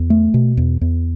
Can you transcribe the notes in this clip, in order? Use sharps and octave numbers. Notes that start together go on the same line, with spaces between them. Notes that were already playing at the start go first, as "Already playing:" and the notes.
Already playing: E2
A3
B2
E2
E2